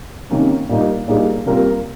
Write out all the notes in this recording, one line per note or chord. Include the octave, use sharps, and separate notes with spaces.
C3 D#3 A#3 C#4
A#2 G3 A#3 D#4
A#2 G3 A#3 D#4 G#4
C3 G3 A#3 F4 A#4